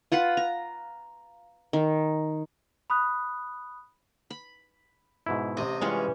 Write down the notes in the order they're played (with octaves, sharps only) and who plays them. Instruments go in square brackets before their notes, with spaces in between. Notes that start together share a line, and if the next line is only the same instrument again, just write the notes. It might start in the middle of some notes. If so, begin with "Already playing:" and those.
[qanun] F4 B4 F#5
A#5
D#3
[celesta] B5 D#6 F#6
[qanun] B5
[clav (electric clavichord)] G#2 B2 E4
[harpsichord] A1 C3 [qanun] D#5
[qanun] E3 G3 C#4 [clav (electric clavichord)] G#3 F4